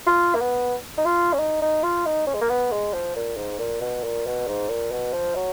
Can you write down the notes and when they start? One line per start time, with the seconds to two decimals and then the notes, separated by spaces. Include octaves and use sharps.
0.07 F4
0.35 A#3
0.41 B3
0.98 D#4
1.06 F4
1.33 C#4
1.39 D#4
1.62 D#4
1.83 F4
2.06 D#4
2.27 C#4
2.35 G#3
2.42 A#3
2.50 B3
2.72 G#3
2.93 F3
3.16 A#2
3.37 G#2
3.59 A#2
3.81 B2
4.04 A#2
4.26 B2
4.48 G#2
4.70 A#2
4.92 B2
5.14 F3
5.36 F#3